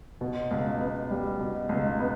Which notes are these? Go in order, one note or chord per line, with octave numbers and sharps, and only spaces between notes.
B2
C#2
B3
G3
B2
C#2
B3